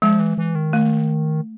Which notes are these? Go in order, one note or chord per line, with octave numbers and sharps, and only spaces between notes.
F3 G#3
E3
E3
D#3
A3